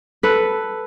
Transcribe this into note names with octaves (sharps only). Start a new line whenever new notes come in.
A4 B4